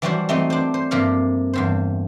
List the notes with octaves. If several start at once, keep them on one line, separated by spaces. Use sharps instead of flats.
E3 F#3 G3 D4 F#4 C5
E3 A3 C4 D#4
D4 C5
C5
G2 C3 F3 A#3 F5
E2 G2 C5